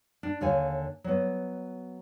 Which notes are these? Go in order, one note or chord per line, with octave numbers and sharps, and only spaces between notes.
D4
D#2 D3 C#5 F5 G#5
F#3 B3